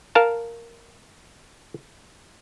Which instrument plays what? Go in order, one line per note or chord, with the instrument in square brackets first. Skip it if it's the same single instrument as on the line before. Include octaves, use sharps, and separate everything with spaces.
[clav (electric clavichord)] A#4 F5 A5